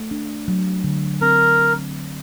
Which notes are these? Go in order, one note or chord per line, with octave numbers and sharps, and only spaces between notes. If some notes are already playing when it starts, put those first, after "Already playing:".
Already playing: A3
D4
F#3
D3
C4 A#4